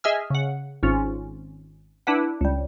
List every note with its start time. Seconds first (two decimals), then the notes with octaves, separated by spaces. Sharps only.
0.04 G#4 D#5 E5 G#5 E6 F6
0.30 C#3 F#5
0.83 G#1 G#2 C#4 F4
2.07 D4 E4 B4 F#5
2.41 C#2 G3